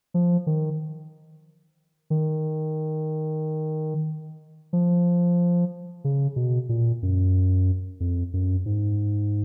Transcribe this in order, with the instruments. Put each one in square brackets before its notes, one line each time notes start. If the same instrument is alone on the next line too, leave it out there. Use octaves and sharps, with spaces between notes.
[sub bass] F3
D#3
D#3
F3
C#3
B2
A#2
F#2
F2
F#2
G#2